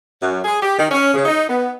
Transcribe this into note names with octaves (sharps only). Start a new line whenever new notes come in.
F#2
G#4
G4
D#3
C#4
C#3
D#4
B3